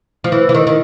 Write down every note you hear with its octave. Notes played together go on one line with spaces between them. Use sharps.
F3
E3
E3
D#3
D#3